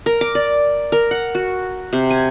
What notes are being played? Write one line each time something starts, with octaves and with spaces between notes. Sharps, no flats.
A#4
D6
D5
A#4
F#5
F#4
C3
G#5